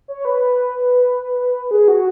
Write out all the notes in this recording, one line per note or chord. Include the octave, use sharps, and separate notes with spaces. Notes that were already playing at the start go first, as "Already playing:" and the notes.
C#5
B4
G#4
F#4